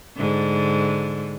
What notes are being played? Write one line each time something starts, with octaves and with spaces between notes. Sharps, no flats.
G#2 D3